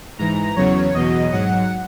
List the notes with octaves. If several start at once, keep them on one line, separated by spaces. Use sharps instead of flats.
G#2 E3 A#5
E2 C#3 F#3 C#5
E2 B2 F#3 D#5
G#2 F#3 F#5